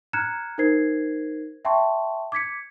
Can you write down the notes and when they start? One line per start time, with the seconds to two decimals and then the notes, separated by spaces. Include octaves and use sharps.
0.13 A#5 F6 F#6 G#6 C#7 E7
0.58 D#4 A#4 C5 G#6 C7
1.65 E5 G5 A5 C6 C#6
2.32 D6 G#6 B6 C#7